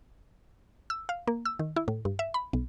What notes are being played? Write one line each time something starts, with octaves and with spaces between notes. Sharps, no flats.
E6
F5
A#3
E6
D#3
E4
A2
G2
E5
B5
B1